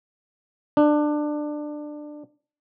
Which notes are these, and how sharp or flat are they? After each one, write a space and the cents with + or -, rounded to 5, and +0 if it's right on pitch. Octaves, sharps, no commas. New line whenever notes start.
D4 +20